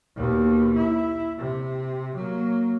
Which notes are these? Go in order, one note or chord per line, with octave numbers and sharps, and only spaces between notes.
D#2 B2
E4
C3
F#3 A#3